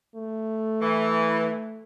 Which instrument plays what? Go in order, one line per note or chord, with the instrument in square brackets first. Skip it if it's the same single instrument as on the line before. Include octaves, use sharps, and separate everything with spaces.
[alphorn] A3
[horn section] E3